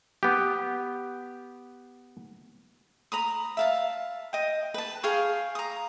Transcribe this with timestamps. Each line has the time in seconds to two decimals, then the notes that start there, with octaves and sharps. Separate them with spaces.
0.23 B3 G4
3.12 A#5 B5 D#6
3.57 E5 F5 A5
4.33 D#5 G5
4.74 B4 A5
5.03 G#4 F5 G5 C#6
5.55 A#5 D#6